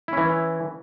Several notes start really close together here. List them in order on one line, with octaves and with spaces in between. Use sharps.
E4 C#4 E3